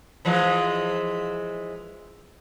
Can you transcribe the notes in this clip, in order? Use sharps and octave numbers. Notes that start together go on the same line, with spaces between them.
E3 F3 G#3